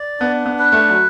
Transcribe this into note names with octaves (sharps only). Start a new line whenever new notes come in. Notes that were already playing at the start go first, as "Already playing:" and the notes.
Already playing: D5
B3 D4
B3
B4
A3
F#3